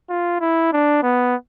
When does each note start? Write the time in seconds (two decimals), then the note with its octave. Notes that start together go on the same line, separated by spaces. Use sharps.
0.10 F4
0.40 E4
0.73 D4
1.03 B3